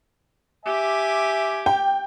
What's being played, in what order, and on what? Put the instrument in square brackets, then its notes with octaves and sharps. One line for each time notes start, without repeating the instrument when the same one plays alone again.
[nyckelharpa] G4 D6 [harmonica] E5 G#5
[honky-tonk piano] G5